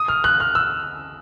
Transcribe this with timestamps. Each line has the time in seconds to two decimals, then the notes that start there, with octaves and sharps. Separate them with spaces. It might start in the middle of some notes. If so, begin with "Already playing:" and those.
Already playing: D#6
0.08 F6
0.24 F#6
0.40 F6
0.55 E6